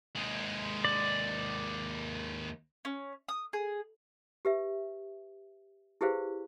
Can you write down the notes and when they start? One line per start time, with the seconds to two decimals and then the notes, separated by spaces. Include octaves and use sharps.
0.16 D#2 G#3
0.85 D5
2.85 C#4
3.28 D#6
3.53 G#4
4.45 G4 B4 E5
6.01 E4 G4 G#4 B4 C5 F5